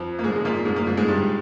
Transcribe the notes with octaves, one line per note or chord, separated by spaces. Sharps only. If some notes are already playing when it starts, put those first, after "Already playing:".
Already playing: F2 F3
A#3
G#2 G#3
G#3
A#2 A#3
G#2 G#3
A#2 A#3
G#2 G#3
G#2 G#3
G2 G3